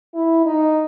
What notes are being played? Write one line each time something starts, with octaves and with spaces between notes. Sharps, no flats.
E4
D#4